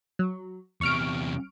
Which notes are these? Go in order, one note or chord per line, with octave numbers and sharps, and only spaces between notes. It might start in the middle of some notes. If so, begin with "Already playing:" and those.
F#3
E2 C3 C#6 F6 D7